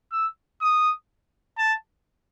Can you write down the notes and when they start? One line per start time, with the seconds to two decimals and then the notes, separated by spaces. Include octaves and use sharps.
0.12 E6
0.62 D#6
1.58 A5